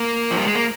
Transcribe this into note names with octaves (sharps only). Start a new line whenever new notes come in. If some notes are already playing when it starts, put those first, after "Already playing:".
Already playing: A#3
F3
G3
G#3
A#3